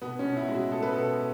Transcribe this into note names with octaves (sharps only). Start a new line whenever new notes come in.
B2 B3
C#4
B2
E4
G#3
F#4
G#3 A4
B4
B2 A4